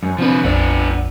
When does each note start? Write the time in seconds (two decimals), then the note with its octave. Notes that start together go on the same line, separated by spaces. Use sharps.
0.03 F#2
0.19 C3 F3 C4 D4 B4
0.44 A#1 F2 B3 D4 E6